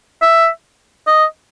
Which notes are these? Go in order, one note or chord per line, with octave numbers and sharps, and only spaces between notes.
E5
D#5